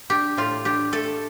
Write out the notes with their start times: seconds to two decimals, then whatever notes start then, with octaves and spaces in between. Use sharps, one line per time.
0.10 D4 G4
0.37 A2 F4
0.65 D4 G4
0.92 A3 A4